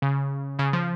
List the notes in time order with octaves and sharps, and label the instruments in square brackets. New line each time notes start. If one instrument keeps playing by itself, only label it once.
[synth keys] C#3
C#3
F3